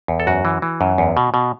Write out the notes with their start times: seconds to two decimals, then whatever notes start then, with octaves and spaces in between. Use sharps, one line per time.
0.08 E2
0.20 A4
0.27 F#2 F#4
0.45 E3
0.62 E3
0.81 F#2
0.98 E2
1.17 B2
1.34 B2